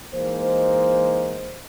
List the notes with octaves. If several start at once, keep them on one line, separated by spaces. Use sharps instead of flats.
E3 G#3 A#3 D#4 C5